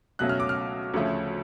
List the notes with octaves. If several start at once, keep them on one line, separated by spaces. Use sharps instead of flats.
C#2 B2 F#3 A3 C#4 F#6
F6
D6
F6
D2 C#3 F3 A3 C#4